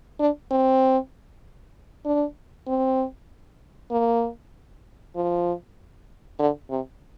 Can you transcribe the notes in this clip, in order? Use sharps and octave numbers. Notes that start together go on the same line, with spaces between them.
D4
C4
D4
C4
A#3
F3
D3
C3